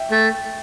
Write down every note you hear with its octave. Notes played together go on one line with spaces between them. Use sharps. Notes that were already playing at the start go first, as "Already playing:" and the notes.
Already playing: E5 G5
A3